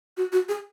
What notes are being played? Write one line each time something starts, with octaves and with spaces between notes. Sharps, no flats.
F#4
F#4
G#4